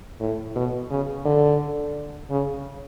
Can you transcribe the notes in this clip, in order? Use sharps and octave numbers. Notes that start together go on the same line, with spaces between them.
A2
B2
C#3
D3
C#3